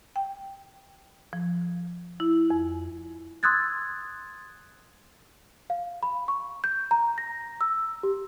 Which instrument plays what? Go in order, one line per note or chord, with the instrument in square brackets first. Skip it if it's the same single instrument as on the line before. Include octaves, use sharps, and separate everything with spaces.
[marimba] G5
F3
E4
F2
[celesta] C6 D#6 E6 F#6 G#6 A6
F5
B5
C#6
G6
A#5
A#6
E6
G4